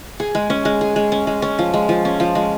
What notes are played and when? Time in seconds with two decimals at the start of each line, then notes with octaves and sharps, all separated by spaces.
0.20 G#4
0.35 G#3
0.50 C#4
0.65 G#3
0.81 G#4
0.96 G#3
1.12 C#4
1.27 G#3
1.42 C#4
1.59 F3
1.74 G#3
1.89 F3
2.05 C#4
2.20 F3
2.35 G#3